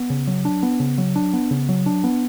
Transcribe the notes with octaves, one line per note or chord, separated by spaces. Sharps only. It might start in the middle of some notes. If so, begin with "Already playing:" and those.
Already playing: B3
C#3
F#3
D4
B3
C#3
F#3
D4
B3
C#3
F#3
D4
B3